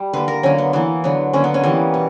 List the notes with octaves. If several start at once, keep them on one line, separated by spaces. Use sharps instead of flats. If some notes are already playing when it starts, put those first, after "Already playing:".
Already playing: G3
D3 A#3 B4
A#4
D3 F#3 A#3 C#4
B3
E3 A#3 B3
D3 F#3 B3
D3 A#3 C#4
B3
C#4
E3 G3 A#3 B3
B2